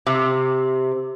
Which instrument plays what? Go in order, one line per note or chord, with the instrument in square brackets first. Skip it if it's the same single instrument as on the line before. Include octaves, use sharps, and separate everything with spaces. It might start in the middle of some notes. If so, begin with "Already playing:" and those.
[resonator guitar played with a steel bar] C3